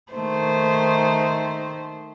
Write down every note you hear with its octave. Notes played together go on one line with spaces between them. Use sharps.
D#3 A3 C5